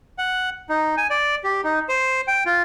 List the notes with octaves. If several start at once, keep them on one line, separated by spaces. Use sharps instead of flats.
F#5
D#4
G#5
D5
G4
D#4
C5
G5
F4